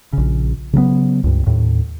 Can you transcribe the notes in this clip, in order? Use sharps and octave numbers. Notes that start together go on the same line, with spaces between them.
A#1 C#3
C#3 F#3 A3 B3
C#2 G2
D#2 A2